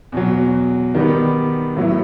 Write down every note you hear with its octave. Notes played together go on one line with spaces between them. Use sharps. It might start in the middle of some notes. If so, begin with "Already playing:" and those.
E2 B2 F#3
D#3 G3 B3
A2 F#3 B3 E4